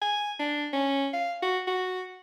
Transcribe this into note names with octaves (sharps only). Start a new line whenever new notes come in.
G#5
D4
C#4
F5
F#4
F#4